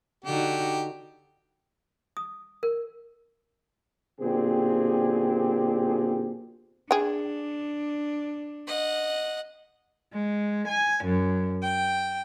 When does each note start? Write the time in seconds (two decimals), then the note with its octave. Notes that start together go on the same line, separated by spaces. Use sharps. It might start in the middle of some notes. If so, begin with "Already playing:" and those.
0.25 D3 D#4 F#4 G4
2.17 D#6
2.63 A#4
4.20 B1 A#2 D3 C4 G4 G#4
6.91 D4 G#4 G5
8.67 D#5 F#5
10.14 G#3
10.68 G#5
11.04 F#2
11.62 G5